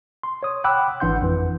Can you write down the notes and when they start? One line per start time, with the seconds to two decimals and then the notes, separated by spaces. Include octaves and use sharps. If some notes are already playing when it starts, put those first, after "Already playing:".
0.23 C6
0.43 C#5 D#6
0.64 F#5 G5 B5 D6 E6 F#6
1.00 G#1 E3 D4 F#5 C6 G6
1.22 F2 E3